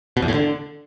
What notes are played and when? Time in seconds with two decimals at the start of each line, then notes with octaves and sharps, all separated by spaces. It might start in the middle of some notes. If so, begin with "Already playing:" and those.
0.17 B2
0.22 E2
0.28 A2
0.34 D3